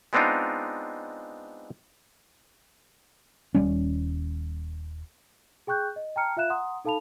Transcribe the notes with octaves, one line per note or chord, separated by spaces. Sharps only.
G#3 B3 C4 D4 D#4 F4
D#1 G3 C#4
G#4 G5 C#6 F#6 G6
D#5
G5 A5 A#5 F6 C#7
F4 E5 F5 F#6 E7
F#5 A#5 C6 D#6
D#4 A4 F5 A5 B5 F7